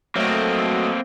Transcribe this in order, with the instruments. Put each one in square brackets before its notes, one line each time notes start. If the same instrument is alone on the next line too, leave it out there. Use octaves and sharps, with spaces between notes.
[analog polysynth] F#3 A3 D#5 [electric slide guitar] A#3 C4